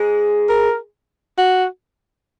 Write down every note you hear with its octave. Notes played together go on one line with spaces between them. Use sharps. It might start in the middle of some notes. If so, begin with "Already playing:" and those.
Already playing: G#2 G#3
A#4
F#4